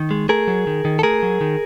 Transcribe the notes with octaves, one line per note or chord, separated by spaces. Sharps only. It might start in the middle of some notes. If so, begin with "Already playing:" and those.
Already playing: D#3
G#3
A3 G#4 A#4
F#3
D#3
D#3
A4
A3 G#4 A#4
F#3
D#3